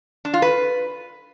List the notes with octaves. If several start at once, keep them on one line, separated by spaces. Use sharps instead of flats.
D4
F4
B4